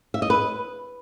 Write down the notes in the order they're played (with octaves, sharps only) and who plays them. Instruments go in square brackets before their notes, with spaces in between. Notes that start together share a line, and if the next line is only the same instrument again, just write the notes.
[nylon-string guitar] E5
D#5
B4